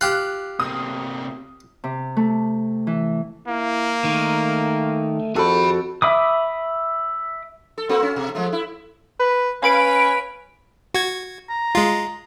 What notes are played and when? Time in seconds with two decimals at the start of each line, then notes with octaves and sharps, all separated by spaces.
0.01 F4 G4 F#6
0.60 C3 A#3 D#6
1.84 C3
2.17 A3
2.87 E3
3.47 A#3 E4
4.04 D#3 A3
5.36 F2 F#4 G#4 A4 B5
6.02 E5 B5 D6 D#6
7.78 A4
7.89 A#3 C4 F#4
8.02 C#4
8.16 B2
8.35 F3 G#3 A3
8.53 E4
9.19 B4
9.63 C#4 B4 F5 B5 D7
10.94 F#4 G#6
11.49 A#5
11.75 G#3 F4